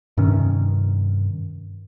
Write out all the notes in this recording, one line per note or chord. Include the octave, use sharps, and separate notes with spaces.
G2 C3 D#3 C#4